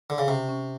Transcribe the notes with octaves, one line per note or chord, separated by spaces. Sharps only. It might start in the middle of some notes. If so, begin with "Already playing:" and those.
D3
C#3
C3 C#4
C#4